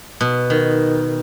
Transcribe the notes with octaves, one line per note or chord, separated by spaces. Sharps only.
B2
D#3